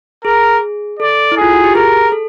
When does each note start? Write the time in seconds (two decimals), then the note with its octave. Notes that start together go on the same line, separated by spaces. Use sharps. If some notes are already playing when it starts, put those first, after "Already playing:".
0.25 G#4 A#4
0.99 A4 D5
1.32 E4
1.37 F4 G#4
1.53 F#4
1.64 G4
1.75 G#4 A#4
2.12 A4